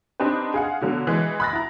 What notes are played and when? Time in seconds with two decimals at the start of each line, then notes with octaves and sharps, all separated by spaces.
0.20 C4 D4 D#4 G4 B4
0.54 G#4 F5 F#5
0.81 B2 D3 F#3
1.07 E3 G#3
1.40 B5 D#6 F#6 A6 A#6
1.53 E4 A#5